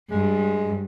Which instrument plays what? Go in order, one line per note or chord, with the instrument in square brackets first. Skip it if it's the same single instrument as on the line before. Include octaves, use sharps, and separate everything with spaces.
[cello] G2 [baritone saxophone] G#3